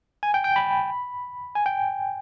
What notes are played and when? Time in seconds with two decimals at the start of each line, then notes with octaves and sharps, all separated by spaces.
0.23 G#5
0.34 G5
0.44 G5
0.56 B5
1.55 G#5
1.66 G5